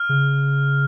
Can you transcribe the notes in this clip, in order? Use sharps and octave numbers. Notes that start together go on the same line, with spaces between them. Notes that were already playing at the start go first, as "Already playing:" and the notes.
Already playing: F6
C#3